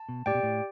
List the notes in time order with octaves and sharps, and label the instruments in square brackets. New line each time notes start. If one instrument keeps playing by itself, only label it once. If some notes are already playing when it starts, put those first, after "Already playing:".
Already playing: [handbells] A5
[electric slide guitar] B2
[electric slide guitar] A2 [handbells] G4 D5 G5
[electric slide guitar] B2
A2